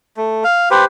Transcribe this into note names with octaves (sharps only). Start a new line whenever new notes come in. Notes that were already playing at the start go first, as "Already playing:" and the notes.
A3
F5
G4 B4 C5